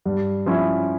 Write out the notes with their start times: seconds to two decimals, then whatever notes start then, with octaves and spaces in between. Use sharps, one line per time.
0.05 G2
0.46 F3 C#4 E4